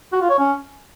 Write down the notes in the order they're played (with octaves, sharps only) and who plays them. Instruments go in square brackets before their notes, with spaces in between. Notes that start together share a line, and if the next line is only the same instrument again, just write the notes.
[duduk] F#4
F4
C#5
C#4